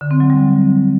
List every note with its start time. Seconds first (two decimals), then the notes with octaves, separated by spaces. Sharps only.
0.01 D3
0.11 C4
0.20 F#3
0.30 G3